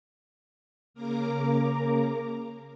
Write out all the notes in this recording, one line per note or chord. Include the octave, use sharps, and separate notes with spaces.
C#3 A#3 A#4 A#5 D6